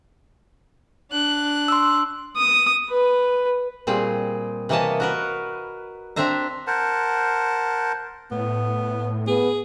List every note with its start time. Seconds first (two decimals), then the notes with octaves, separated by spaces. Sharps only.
1.11 D4 F#6
1.68 C6 E6
2.36 D#6
2.90 B4
3.87 A#2 G3 C4 G#4
4.69 C3 E3 A#3 C#5 D#5 A5
5.00 F#4 A#4 B4
6.16 C4 D4 C5 E5 A#5
6.67 A#4 C5 F#5 A5
8.31 A2 B3
9.27 B3 G#4